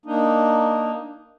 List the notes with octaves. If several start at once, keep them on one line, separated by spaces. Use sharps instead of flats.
A#3 D4 D#4